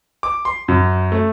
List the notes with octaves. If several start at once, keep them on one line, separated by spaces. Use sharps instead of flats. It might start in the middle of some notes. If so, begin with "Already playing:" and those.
D6
C6
F#2
A3